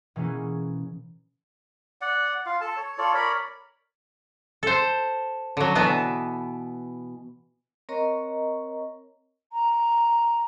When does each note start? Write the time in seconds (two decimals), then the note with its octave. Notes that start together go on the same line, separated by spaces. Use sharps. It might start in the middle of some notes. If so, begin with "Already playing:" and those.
0.16 B2 E3 A#3 C#4 G#4
2.01 D5 F#5
2.46 F4 F5
2.61 A4 A5
2.77 C#5
2.98 F4 A4 C#5 D5
3.14 A#4 C#5 D5 B5
4.63 A4 C5
5.57 D3 F#3
5.75 B2 E3 B3 A5
7.89 C4 A#4 C#5 D#5 A#5 C#6
9.53 A#5